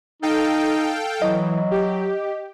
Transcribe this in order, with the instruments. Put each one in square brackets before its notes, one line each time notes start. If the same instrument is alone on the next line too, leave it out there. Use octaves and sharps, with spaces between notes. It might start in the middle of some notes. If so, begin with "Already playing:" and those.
[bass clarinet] D#4 [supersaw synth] A4 F5 G5
[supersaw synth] E3 [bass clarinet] F#3 [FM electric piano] D#5
[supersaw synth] G4